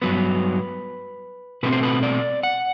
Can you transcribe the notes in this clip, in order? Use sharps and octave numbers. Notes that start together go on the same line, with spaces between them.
G2 F#3 B3 B4
B2 A3 C4 B4
C5
B4
D5
F#5